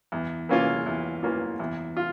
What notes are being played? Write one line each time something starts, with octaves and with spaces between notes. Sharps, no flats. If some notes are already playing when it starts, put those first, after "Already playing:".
E2
E3 A#3 C#4 F4
E2
E3 A#3 C#4 F4
E2
F4